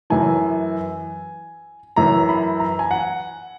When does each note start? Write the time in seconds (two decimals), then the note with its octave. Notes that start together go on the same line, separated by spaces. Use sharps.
0.10 F#2 E3 G#5
1.96 F#2 E3 A#5
2.29 B5
2.60 A#5
2.79 G#5
2.91 F#5